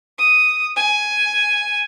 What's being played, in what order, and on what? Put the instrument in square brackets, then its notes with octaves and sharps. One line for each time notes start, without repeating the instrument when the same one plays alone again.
[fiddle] D#6
G#5